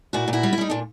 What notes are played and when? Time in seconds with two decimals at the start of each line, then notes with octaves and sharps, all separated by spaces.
0.13 A#2 E4 F#4
0.28 A#2
0.33 E4 F#4
0.43 G3
0.53 E4
0.58 G3 D#4
0.70 A#2 D4